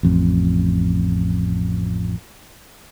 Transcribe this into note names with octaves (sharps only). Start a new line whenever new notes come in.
A1 F2